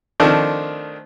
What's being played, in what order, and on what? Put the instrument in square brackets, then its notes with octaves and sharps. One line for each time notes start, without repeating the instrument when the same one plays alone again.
[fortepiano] D#3 F3 A3 C4 D4